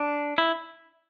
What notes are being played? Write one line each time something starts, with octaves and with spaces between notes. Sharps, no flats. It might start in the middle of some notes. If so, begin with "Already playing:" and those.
Already playing: D4
E4